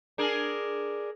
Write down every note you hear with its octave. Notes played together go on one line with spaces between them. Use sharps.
D4 G#4 A#4